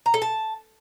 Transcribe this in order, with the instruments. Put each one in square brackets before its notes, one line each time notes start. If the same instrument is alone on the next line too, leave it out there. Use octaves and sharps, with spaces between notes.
[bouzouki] A#5
A4
A5